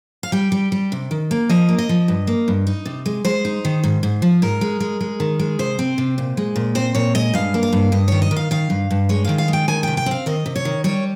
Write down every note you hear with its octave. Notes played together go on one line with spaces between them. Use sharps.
F5
G3 G5
G3
G3
C3
D#3
A#3
F3 D#5
A#3
D#5
F3
G2
A#3
G2
D#4
C3
G#3
G#3 C5
D#4
D#3
G#2
G#2
F3
G#2 A#4
G#3
G#3
G#3
D#3
G#3
C3 C5
C4
C3
A#2
G#3
A#2
C4 C5
A#2 C#5
G#3 D#5
G2 F5
A#3
F5
G2
G2 D#5
D#3 C#5
D#5
D#3
F5
D#3 F5
G2
G2
G#3 C#5
D#3 F5
F5
G#3
G5
D#3 G#5
C3 G5
G5
C4 F5
D#3 D#5
C3
C#5
D#3
G3 C#5